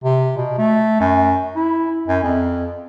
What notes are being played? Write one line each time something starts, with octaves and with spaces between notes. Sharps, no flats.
C3
B2
A3
F#2
E4
F#2
F2